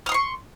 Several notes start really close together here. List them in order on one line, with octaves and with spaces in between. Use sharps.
F6 D#6 C6 C#6